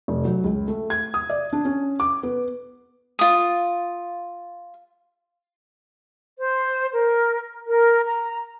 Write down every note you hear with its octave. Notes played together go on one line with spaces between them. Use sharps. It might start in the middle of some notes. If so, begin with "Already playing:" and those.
F1
F#3
C#2
A3
G#6
D#6
D5
D4
C#4
D6
B3
F4 D#6
C5
A#4
A#4
A#5